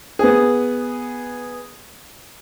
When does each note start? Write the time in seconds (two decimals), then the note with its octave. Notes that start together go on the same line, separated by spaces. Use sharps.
0.19 B3 G#4